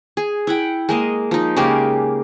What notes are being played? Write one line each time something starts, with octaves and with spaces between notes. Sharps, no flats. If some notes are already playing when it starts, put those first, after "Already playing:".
G#4
E4 F#5 G5
G#3 A#3 D#5
F3 D#4
C#3 G#3 A#3 G4